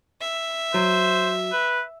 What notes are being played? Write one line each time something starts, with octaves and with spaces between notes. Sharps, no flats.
E5
F#3 C5
B4